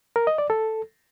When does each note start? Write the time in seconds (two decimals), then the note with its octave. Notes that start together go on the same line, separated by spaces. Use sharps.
0.16 A#4
0.27 D#5
0.38 D5
0.50 A4